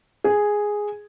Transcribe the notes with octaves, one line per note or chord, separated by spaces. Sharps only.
G#4